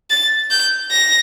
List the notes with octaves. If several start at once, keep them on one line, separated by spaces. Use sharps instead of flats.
A6
G6
A#6